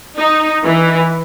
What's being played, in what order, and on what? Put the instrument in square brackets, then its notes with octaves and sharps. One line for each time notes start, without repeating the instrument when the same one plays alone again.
[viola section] D#4
E3